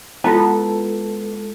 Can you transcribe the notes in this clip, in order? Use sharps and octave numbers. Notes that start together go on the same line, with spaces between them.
G#3 B3 E4 F4 A4 A5